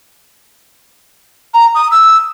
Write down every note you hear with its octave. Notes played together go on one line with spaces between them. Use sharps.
A#5
D#6
E6